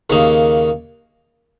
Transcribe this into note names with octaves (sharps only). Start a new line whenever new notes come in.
D#2 C#3 A#3 D#4